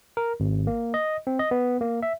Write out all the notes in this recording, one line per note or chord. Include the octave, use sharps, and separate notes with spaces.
A#4
G#1
A#3
D#5
C4
D#5
B3
A#3
E5